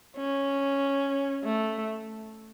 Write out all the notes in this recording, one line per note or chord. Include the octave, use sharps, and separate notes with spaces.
C#4
A3